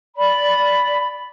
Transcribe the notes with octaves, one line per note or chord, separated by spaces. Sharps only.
D5 B5